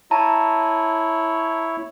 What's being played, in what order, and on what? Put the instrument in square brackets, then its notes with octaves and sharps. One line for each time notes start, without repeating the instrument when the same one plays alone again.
[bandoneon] E4 C#5 [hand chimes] A5 A#5